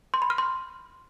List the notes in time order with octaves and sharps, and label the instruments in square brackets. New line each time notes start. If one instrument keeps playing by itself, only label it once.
[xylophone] C6
B5
F6
C6